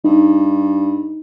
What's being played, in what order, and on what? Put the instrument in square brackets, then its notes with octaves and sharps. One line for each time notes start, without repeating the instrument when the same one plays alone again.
[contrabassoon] G2 [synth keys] D#4